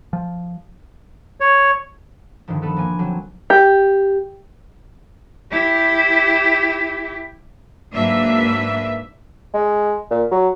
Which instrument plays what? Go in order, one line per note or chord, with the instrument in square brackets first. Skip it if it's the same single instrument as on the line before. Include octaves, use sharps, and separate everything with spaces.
[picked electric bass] F3
[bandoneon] C#5
[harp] G2 D3 D#3 F3
B3 A4 B4
F3 A#3 G#5
D3 F#3 C4
[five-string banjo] G4
[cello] E4 G4
[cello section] G#2 F#3 A#3 D4 B4 E5
[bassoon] G#3
A#2
F#3